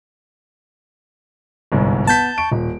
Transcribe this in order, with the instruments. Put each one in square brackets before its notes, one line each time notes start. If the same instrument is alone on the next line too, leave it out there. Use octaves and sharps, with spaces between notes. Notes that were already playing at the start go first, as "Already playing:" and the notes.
[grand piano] G1 C2 G#2
[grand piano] B3 B6 [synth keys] A5 G6
[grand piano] C#6 D7
D#1